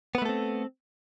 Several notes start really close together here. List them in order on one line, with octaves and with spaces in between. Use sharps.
B3 B4 A3 A4 C4